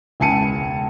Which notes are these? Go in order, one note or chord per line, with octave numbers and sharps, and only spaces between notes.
E1 C#2 G#5 A5 C#7 D#7